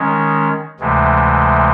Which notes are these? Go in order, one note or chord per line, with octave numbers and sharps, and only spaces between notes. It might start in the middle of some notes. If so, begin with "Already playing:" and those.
Already playing: D#3 G#3 C#4
D2 C3 E3 G#3